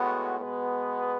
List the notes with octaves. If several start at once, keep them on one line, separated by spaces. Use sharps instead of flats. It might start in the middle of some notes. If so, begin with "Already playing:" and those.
Already playing: A2 G#3 B3 F#4
B2 G#3 B3